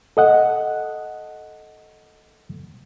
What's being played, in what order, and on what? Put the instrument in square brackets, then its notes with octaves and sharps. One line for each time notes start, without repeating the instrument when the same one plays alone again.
[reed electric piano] A4 D#5 F#5